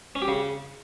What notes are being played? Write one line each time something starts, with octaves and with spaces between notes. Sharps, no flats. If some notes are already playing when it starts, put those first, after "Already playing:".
C#4
G4
C#3